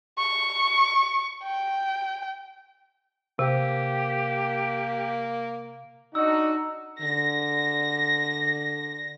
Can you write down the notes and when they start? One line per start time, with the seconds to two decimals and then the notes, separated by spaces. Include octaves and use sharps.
0.18 C#6
1.43 G5
3.39 C3 A#3 G4
6.15 D4 D#4 F#4 D#5 E6
7.01 D3 A#6